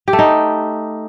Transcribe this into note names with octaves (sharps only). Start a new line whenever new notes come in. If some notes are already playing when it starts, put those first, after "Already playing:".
G4
A3
D#4